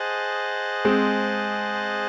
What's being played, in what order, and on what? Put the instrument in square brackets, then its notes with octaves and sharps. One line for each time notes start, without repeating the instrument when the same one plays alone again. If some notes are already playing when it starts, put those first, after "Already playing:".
Already playing: [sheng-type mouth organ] G#4 C5 D#5 F#5 A5
[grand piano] G#3 C4